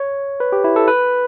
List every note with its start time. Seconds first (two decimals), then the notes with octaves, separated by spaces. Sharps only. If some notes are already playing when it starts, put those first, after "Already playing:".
Already playing: C#5
0.40 B4
0.52 G4
0.64 E4
0.76 A4
0.88 B4